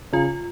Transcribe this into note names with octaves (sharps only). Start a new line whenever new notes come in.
C#3 F4